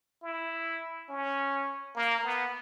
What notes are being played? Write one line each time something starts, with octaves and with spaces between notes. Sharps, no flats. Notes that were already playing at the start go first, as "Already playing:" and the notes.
E4
C#4
A#3
B3